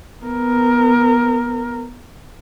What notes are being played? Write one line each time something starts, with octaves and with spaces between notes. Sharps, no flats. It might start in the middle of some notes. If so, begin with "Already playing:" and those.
B3 A#4